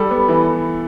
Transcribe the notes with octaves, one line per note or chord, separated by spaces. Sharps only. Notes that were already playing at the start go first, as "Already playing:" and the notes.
Already playing: G3 A4
B3
E3